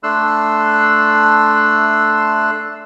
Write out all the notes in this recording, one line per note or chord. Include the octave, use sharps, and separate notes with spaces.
A3 D4 C6 E6 F#6